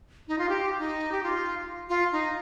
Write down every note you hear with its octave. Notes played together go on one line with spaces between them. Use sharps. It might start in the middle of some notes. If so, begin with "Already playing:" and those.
D#4
F4
G4
D#4
G4
F4
F4
D#4